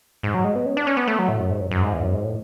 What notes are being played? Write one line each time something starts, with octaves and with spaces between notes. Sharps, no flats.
G#2
F#3
G#3
B3
C#4
D4
C#4
B3
A3
F#3
A2
F#2
G#2
F#2
F#2
G#2
E2
F#2
G#2
A2